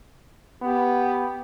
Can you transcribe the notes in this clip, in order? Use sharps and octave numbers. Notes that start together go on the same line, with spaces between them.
B3 G4